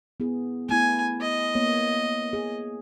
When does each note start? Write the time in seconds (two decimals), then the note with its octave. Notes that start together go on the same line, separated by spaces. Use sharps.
0.20 B3 E4 G#4
0.69 A3 B3 E4 G#5
1.21 D#5
1.55 A#3 B3 C#5
2.33 G#4